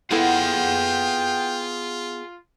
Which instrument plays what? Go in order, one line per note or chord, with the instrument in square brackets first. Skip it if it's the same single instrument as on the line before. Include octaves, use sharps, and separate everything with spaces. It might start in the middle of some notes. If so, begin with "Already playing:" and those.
[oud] B3 E4 A4 [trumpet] F4 [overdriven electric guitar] G#4 F#5 [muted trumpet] G5